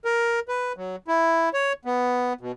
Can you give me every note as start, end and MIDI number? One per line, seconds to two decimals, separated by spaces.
0.05 0.40 70
0.48 0.72 71
0.77 0.96 54
1.08 1.49 64
1.54 1.73 73
1.85 2.33 59
2.41 2.52 47